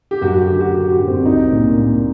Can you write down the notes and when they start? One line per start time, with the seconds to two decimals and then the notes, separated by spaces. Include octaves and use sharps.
0.11 G4
0.21 F#2 F#4
0.34 F#4
0.47 D3 G4
0.60 F#4
0.73 D3 G4
0.83 G4
0.90 F#4
1.00 F#2
1.08 C4
1.20 D4
1.25 C2 D#4
1.52 A#2
1.78 A#2